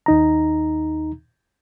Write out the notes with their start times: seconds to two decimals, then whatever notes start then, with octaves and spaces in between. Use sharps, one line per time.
0.06 D#2 D#4 A#5